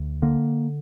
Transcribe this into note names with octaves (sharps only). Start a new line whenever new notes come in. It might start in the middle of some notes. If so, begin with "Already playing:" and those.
Already playing: D2
D3 A#3